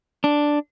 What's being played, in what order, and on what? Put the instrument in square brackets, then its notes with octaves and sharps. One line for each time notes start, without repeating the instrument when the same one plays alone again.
[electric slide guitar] D4